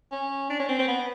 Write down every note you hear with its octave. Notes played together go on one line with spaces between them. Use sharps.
C#4
D4
C#4
C4
C4
B3